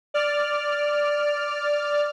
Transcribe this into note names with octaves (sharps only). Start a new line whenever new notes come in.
D5 F6